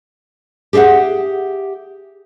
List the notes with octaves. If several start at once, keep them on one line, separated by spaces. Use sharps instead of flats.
G4 G#4 D5 E5 F#5